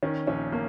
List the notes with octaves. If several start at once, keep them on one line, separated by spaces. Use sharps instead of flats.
D#3 C#4
A#1 C#4
A#3